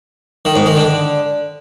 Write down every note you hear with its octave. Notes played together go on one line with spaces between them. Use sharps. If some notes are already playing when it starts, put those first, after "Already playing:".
D#3
G#2
D#3
D3